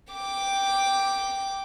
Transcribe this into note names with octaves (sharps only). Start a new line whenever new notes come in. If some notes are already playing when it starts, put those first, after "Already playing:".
G5 D6